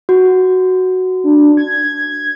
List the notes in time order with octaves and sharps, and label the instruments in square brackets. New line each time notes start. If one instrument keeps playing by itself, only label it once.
[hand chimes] F#4
[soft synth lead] D4
G#6